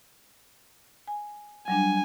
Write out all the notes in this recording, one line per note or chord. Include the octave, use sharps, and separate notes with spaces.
G#5
F#3 G3 D4 G#5